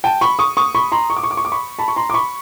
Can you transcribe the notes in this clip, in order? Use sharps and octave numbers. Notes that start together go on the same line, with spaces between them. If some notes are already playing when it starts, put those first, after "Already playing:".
G5 A5
B5 C#6
C#6 D#6
C#6 D#6
B5 C#6
A#5 C6
C#6
D6
C#6
D6
C#6
D6
B5 C#6
A5 B5
C#6
A#5 C6
D6
B5 C#6